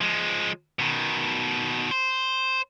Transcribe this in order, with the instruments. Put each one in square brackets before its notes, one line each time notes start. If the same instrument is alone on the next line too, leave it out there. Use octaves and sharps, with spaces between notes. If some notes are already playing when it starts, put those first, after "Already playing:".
[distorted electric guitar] F3 G#3
B2 D#3
C5